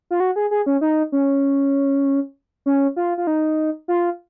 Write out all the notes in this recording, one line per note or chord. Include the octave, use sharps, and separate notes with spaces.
F4
F#4
G#4
G#4
C#4
D#4
C#4
C#4
F4
F4
D#4
F4